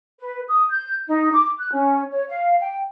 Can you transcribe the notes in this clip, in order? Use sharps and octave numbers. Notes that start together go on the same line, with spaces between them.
B4
D#6
G6
D#4
D6
F#6
C#4
C#5
F5
G5